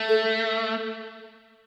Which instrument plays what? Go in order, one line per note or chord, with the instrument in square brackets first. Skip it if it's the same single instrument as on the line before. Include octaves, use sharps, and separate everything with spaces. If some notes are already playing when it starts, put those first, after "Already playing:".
Already playing: [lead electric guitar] A3
[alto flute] A4